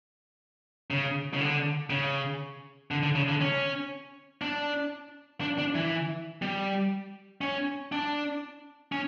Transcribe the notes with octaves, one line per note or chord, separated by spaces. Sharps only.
C#3
C#3
D3
C#3
D3
D3
C#3
D3
C#4
D4
D4
D4
E3
G3
C#4
D4
C#4